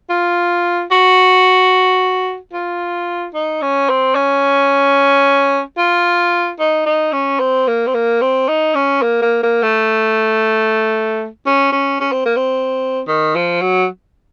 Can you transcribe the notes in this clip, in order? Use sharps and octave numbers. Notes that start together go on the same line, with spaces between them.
F4
F#4
F4
D#4
C#4
C4
C#4
F4
D#4
D#4
C#4
C4
A#3
C4
A#3
C4
D#4
C#4
A#3
A#3
A#3
A3
C#4
C#4
C#4
C4
A#3
C4
D#3
F3
F#3